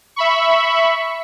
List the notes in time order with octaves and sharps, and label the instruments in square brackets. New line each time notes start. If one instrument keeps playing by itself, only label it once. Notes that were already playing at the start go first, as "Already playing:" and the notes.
[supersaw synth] E5 B5 C#6